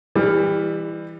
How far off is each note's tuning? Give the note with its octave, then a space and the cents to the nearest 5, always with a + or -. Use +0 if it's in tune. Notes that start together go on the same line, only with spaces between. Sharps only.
E3 +0 G3 +25